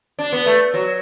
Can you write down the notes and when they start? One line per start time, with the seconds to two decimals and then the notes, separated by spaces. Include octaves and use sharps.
0.19 D4
0.33 B3
0.46 A3
0.74 F#3